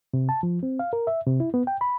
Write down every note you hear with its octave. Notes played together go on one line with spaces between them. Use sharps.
C3
A5
F3
C4
F5
A#4
E5
C3
E4
B3
G5
B5